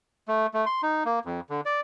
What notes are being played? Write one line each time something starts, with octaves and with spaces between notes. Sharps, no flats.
A3
A3
C6
D#4
A#3
F2
D3
D5